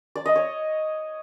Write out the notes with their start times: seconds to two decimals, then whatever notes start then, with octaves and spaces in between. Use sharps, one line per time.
0.15 D5
0.26 D#5
0.36 C#5